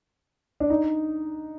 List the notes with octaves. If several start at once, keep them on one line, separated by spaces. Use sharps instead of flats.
D4
D#4